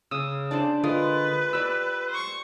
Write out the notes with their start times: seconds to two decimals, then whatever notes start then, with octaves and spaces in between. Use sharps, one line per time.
0.11 C#3 D#6 E6
0.51 D4 C5 D5 A5
0.84 D3 G#3 F4 A#4 B4 D#6
1.53 G4 D5 E6
2.10 C5 C#6